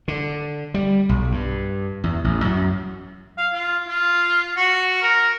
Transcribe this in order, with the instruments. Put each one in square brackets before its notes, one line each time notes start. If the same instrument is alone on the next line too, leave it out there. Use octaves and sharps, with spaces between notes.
[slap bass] D3
G3
B1
G2
E2
A1
F#2
[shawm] F5
F4
F4
F#4
A#4